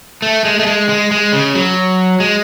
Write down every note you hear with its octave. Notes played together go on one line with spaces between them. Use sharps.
A3
G#3
A3
G#3
G#3
G#3
C#3
F#3
G#3